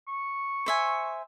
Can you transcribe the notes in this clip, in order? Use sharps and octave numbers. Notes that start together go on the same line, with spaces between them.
C#6
C5 E5 G#5